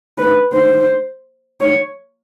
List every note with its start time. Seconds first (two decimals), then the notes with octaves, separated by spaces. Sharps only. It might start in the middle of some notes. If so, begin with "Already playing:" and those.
0.18 B4
0.53 C5
1.61 C#5